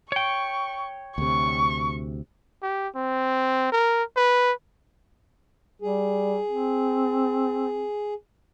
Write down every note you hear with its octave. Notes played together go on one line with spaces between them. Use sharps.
C#5 G5 C#6
D2 C3 C#6
G4
C4
A#4
B4
G3 G#4
C4